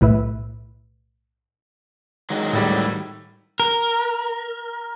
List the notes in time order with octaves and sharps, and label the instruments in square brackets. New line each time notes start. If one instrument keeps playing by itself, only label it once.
[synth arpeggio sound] B1 A2 B4 E5
[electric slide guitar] D#3 F#3 G#3
[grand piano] A2 G3
[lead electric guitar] A#4